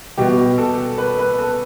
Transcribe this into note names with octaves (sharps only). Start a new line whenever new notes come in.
B2 G3 B3 G4
A4
B4
B4
A4